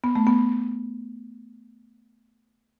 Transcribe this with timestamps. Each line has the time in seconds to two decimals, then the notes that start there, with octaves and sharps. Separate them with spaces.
0.04 B3
0.16 A3
0.27 B3